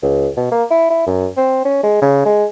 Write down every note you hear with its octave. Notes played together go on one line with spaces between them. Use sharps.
C#2
B2
A#3
E4
E4
F#2
C4
C#4
G#3
C#3
G#3